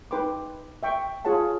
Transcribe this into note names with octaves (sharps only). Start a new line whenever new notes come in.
D#4 B4 G5 B5 C6 D6
E5 G5 C#6
F4 G#4 C#5 F#5 A5